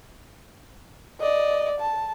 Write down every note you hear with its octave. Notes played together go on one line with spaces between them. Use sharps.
D5 D#5
A5